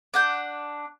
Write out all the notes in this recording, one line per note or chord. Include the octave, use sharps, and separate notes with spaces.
D4 F#5 G6